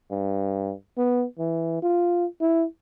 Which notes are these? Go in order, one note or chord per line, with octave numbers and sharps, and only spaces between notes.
G2
B3
E3
F4
E4